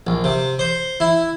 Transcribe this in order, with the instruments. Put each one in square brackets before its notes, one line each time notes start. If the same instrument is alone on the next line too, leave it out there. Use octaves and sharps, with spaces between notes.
[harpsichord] A#1
C3
C5
E4